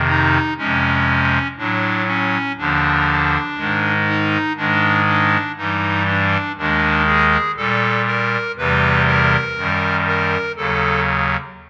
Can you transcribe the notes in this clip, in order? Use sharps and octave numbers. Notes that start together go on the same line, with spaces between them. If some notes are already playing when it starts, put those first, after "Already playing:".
Already playing: F2 C3 D#3
D#4
F2 C3 F3 G#3 C#4
A2 F#3 D4
C#4
D#2 D3 F3 D4
G#2 D#3 G#3
D#4
G#2 D#3 G#3 D4
D4
G2 E3 G3 D#4
D4
D#2 D#3 G#3 D4
G#4
A#2 G3 A4
A#4
E2 C3 E3 G3 B4
A#4
F#2 D#3 G3
A#4
D#2 C#3 F#3 A4